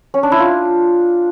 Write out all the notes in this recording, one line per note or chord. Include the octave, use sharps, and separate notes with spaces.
C#4
D4
E4
F4